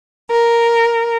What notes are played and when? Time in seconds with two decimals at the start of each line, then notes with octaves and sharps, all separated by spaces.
0.31 A#4